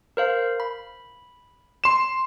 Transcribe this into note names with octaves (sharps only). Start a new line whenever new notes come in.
A#4 C5 F5
B5
C6 E7